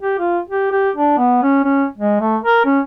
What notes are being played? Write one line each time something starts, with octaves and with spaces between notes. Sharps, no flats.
G4
F4
G4
G4
D4
B3
C#4
C#4
G#3
A3
A#4
C#4